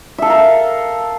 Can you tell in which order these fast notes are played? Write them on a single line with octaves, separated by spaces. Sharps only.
E5 A4 F5 A#4